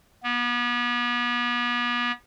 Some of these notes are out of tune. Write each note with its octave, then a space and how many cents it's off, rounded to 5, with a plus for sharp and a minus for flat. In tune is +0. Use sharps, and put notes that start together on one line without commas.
B3 -35